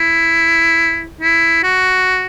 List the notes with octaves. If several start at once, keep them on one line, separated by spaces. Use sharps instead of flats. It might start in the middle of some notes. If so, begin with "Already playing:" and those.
Already playing: E4
E4
F#4